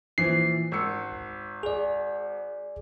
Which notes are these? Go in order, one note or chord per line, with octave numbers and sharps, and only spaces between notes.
A#2 E3 F3 C7
G#1 E6 C#7
G#4 D5